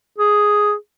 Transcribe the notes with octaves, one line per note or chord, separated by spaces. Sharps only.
G#4